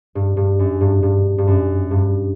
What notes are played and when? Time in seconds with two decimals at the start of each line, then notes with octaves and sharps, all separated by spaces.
0.15 G2
0.37 G2
0.59 F#2
0.81 G2
1.03 G2
1.38 G2
1.47 F#2
1.91 G2